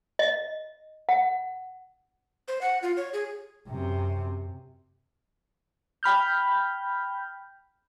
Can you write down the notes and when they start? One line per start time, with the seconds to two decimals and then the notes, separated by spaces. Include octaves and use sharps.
0.19 D#5
1.09 F#5
2.48 C5
2.61 F#5
2.82 F4
2.97 C#5
3.13 G#4
3.68 F#2 C3
6.03 G5 B5 F6 G6